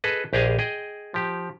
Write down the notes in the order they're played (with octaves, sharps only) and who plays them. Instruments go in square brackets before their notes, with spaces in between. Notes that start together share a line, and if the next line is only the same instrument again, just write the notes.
[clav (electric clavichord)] G#4 A4 B4 D#5
A#1 G4 G#4 D#5 F5 G#5
G#4 D#5 G5
F3 G4